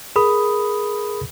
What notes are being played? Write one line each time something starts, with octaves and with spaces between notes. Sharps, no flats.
G#4 A#4 B5 D#6